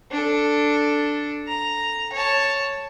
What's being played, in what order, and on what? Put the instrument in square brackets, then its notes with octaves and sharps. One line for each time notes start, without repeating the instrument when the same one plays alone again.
[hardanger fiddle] D4 A4
A#5
C#5 A5